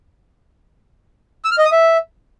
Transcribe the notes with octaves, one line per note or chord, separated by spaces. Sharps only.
E6
F6
D#5
D#6
E5